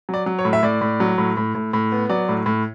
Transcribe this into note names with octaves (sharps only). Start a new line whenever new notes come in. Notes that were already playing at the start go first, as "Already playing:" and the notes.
F#3 D5
F#3
C#5
A2
E5
A2 D5
A2
F#3
A2
A2
A2
A2
B3
F#3 D5
A2
A2